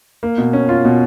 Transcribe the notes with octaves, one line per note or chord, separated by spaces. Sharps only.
A#3
B2
C#4
F4
B2